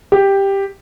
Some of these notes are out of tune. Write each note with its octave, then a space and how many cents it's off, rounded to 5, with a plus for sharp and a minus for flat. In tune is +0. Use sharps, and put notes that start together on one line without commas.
G4 +5